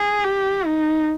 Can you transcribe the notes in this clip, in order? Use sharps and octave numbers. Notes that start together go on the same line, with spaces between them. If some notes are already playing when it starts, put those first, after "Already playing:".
Already playing: G#4
G4
D#4